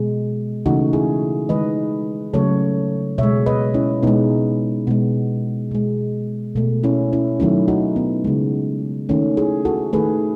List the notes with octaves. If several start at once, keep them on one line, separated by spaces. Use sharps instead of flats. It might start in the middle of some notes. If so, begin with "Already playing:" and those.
Already playing: B2 G#3
C#3 E3 A3 D#4 F#4
E4 G#4
D#3 G#3 B4 D#5
C#3 F#3 A3 A4 C#5
B2 G#3 C#5 E5
B4 D#5
C#4 E4
B2 G#3 B3 D#4
B2 G#3 B3
B2 G#3
B2 A3
C#4 E4
C#4 E4
D#3 F#3 A3 C#4 E4
D#4 F#4
B3
C#3 G#3
D#3 A3 C#4
E4 G#4
F#4 A4
D#3 A3 G#4 B4